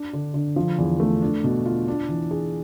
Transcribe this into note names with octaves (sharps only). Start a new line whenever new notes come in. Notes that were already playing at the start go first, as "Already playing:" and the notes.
Already playing: D4
D3
D3
F3
E2
A3
D4
B2
F4
D4
E3
G#4